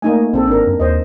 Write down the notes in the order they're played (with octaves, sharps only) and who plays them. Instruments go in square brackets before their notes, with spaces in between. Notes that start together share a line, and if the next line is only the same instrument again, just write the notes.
[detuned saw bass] A3 [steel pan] A#3 D#4 G#5
[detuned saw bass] A#1 [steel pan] C4 A4
[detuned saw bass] G#1 [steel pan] D4 A#4
[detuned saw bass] F#2
[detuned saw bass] D#2 [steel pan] C5 D#5